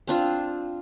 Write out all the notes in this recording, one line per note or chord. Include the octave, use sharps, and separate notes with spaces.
C4 D4 F4